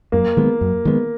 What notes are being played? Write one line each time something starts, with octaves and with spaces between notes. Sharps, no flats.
F#2 A#3
D#3 G#3 B3
F#2
D#3 G#3 B3